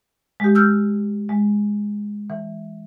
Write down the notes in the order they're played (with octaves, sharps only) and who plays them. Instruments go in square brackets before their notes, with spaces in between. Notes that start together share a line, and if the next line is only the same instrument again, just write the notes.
[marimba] G#3 G4
E6 F6 G6
G#3
E3